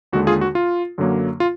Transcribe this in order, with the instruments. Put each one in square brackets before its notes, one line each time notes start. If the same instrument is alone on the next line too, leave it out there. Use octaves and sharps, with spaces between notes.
[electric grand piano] D#2 D3 G#3 F#4
F4 G#4
F#4
F4
F#2 D3 F#3 A#3
F4